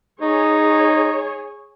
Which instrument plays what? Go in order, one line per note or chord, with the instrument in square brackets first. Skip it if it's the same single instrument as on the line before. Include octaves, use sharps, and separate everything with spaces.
[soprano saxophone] D#4 [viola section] G#4 C#5